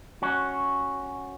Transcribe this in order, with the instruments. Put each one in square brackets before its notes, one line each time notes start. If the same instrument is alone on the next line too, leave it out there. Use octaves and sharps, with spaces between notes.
[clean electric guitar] C#4 F#4